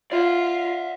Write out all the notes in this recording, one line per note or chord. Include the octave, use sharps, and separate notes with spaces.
F4 D5 E5